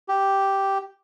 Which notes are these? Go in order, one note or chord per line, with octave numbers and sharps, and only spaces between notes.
G4